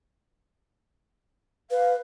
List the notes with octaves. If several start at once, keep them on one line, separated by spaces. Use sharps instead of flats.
B4 F5